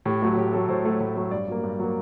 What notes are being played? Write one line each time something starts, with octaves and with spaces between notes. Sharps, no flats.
A2 G4
F#3 A3 F#4
F#4
A2 G4
F#3 A3 A4
A2 C5
F#3 A3
A2
F#3 A3
G2 D5
F#3 A#3
G2
F#3 A#3